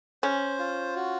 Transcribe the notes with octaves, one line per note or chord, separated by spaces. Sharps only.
C#4 C5
F4
F#4